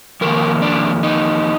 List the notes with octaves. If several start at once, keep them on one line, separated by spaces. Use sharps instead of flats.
F2 D#3 A#3 A#4
D4
D#4